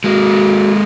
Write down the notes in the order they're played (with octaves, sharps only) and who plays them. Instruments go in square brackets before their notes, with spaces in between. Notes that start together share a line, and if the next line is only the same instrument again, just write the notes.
[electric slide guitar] G#3 A#3 [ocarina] F#4